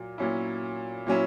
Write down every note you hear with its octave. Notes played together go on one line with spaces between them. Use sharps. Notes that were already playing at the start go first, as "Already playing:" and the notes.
Already playing: A#2 F#3
A#2 F#3 C#4 E4
A#2 F#3 C#4 E4